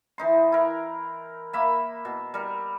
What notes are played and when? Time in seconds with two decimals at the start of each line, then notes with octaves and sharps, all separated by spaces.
0.18 E3 D#4 C6
0.52 E4 A#4
1.53 A#3 E5 B5
2.05 B2
2.34 G3 A#4